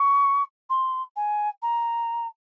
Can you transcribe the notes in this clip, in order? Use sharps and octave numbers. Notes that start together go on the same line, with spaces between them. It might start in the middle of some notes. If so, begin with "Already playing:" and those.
Already playing: C#6
C6
G#5
A#5